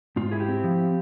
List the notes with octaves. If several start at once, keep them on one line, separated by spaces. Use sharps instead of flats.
G#2 F4
E4 G#4
G4
C4
F3